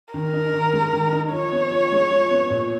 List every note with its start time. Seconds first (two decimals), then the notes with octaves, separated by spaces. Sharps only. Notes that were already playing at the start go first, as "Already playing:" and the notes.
0.14 D#3 A#4
0.33 D#4
0.53 D#3
0.73 G#3
0.93 D#3
1.12 D#4
1.32 F3 C#5
1.52 B3
1.71 F3
1.92 G#3
2.10 F3
2.31 B3
2.50 A#2